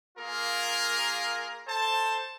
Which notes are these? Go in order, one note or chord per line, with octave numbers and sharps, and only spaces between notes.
A#3 F4 G#4 A#4
A4 C5 A5